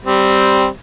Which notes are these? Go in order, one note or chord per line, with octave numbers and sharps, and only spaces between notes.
G3 C4